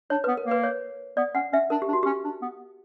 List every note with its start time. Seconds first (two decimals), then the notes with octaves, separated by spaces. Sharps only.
0.10 D4 C#5
0.24 B3 B4
0.37 A#4
0.46 A#3 B4
0.64 C#5
1.17 B3 D5
1.35 C#4 F#5
1.53 C#4 E5
1.70 D4 A#4
1.82 G4
1.88 D4
1.93 F#4
2.03 C#4 G4
2.25 D4
2.42 B3